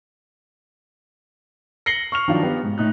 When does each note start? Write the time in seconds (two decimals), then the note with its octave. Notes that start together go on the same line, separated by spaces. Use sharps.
1.86 A#6 C7 C#7 F#7 G7
2.12 C#6 F6 F7
2.28 D#3 F3 F#3 D4 F4
2.43 B3 G4 B4
2.63 G#2
2.78 A2 D#4 F#6